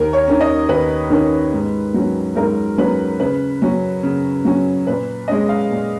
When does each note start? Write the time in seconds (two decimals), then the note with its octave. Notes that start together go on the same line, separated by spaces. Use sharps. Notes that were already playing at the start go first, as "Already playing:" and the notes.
Already playing: D#2 A#4
0.13 C#5
0.28 D#3 A#3 C#4
0.41 D#5
0.68 D#2 B4
1.10 D#3 A#3 C#4
1.53 G#2
1.94 F#3 C#4
2.35 G#2 A#4
2.78 F#3 C#4 B4
3.20 C#3 B4
3.62 F#3 C#4
4.03 C#3
4.45 F#3 C#4
4.87 A#2 B4
5.28 G#3 C#4 D#5
5.49 F5
5.71 A#2